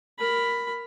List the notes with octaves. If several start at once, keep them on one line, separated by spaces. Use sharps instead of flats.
A#4 B5